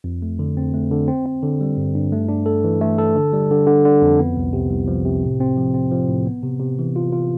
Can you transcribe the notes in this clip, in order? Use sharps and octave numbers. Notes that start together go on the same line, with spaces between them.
F2
A3
D3
C4
A3
D3
C4
C4
D3
G3
G2
G2
A3
D4
A4
E3
A3
A4
D3
G3
D3
D3
D3
F2
B3
C2
C3
C2
F3
C3
A2
C4
F3
C4
F3
A2
B3
C3
C3
E3
F4
F4